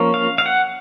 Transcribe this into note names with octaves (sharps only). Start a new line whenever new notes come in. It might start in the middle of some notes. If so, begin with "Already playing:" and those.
Already playing: F3 A#3 C#4
F5
F5
F#5